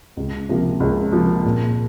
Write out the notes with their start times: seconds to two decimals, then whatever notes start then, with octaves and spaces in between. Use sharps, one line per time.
0.17 C#2
0.49 C3 F3 A#3
0.80 C#2
1.12 C3 F3 A#3
1.45 A#2